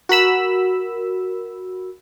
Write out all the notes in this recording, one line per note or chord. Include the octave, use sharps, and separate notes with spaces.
F#4 A#4 B5 E6